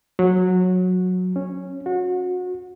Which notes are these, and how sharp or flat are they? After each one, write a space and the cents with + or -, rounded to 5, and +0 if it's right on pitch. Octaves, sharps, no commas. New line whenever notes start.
F#3 -15
C#4 -10
F#4 -30